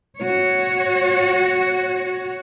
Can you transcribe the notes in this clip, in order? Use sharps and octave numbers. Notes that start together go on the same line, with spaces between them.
F#4 C#5